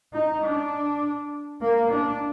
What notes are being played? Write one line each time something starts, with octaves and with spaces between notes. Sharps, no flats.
D#4
D4
A#3
D4